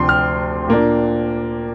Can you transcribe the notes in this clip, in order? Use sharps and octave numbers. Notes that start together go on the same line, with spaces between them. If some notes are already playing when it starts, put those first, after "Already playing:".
Already playing: D2 C3 F3 D4 G5 C6
F6
A#2 A#3 D4